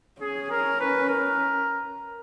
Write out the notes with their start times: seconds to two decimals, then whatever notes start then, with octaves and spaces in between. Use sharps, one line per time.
0.21 C#4 G#4
0.51 A#4
0.80 B4
1.09 A#4